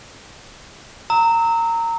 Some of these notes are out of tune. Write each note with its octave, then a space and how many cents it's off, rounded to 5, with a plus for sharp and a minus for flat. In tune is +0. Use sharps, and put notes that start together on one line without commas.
A#5 -20 E6 -30